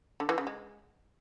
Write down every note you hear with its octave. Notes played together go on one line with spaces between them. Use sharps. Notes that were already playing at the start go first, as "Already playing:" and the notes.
D3
E3
C#3
G#3